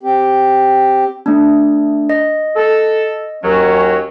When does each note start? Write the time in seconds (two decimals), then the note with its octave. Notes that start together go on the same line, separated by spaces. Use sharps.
0.03 C4 G4
1.26 A3 D4
2.10 D#5
2.56 A4
3.44 D#2 F#3 C#4